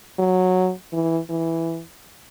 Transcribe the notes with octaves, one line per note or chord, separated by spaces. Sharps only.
F#3
E3
E3